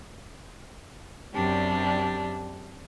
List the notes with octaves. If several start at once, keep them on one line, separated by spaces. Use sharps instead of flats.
F#2 C3 G3 D4